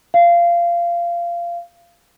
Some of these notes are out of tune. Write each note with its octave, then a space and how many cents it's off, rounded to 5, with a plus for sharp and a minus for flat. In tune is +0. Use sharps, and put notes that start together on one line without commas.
F5 -20